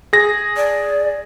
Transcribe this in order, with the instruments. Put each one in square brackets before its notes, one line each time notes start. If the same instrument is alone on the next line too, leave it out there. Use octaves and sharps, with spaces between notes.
[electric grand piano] G#4 A#6
[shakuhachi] D5